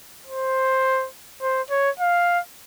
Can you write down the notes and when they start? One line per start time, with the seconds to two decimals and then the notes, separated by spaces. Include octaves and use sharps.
0.27 C5
1.42 C5
1.70 C#5
1.99 F5